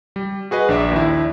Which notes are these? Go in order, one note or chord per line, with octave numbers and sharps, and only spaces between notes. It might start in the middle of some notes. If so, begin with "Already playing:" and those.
G3
F#4 G#4 B4 D#5
A#1 D4 E5 D6
D#2 D4 E4